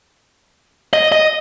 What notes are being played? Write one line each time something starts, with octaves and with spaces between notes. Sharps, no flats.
D#5
D#5